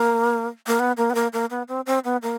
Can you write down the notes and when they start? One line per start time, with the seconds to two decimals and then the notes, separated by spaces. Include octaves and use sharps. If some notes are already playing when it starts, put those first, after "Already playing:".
Already playing: A#3
0.67 A#3
0.79 B3
0.97 A#3
1.10 B3
1.15 A#3
1.33 A#3
1.50 B3
1.68 C4
1.86 C4
2.04 B3
2.22 A#3